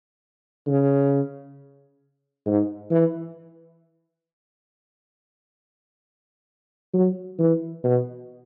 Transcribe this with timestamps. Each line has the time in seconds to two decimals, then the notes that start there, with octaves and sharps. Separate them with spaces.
0.67 C#3
2.46 G#2
2.91 E3
6.94 F#3
7.39 E3
7.84 B2